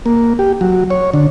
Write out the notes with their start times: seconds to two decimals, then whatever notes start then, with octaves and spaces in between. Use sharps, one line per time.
0.06 A#3
0.39 G4
0.61 F#3
0.90 C#5
1.13 D3